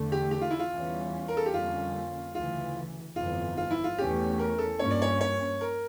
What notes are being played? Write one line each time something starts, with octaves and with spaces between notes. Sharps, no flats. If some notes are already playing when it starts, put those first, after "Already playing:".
Already playing: E2 D3 A3
G4
G4
F4
E4
F4
E2 E3 G3 C#4
A#4
A4
G4
F2 D3 G3 A#3 C#4 F4
D2 C#3 E3 F4
G1 F2 E3 F4
F4
E4
F4
E2 E3 A3 C#4 G4
A#4
A4
G2 F3 A#3 C#4 C#5
D5
C#5
C#5
A#4